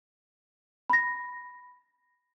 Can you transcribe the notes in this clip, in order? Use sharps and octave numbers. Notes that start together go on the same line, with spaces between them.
B5 A#6